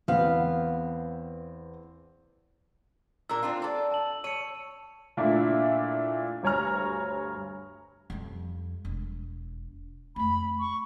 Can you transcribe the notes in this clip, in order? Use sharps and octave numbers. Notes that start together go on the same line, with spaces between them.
E2 B3 C4 F5
A#2 D4 A#4 E6
C4 D4 F4
A4 D5
A5 F#7
C#5 C#7 D#7
A#2 A3 D4 E4
D2 G2 C#5 G#5 A#5 F6
F2 G3
E1
F2 A3 B5
C#6